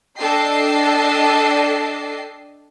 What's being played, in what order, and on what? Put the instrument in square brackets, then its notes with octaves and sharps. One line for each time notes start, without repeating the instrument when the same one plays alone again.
[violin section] D4 A4 D#5 G5 C7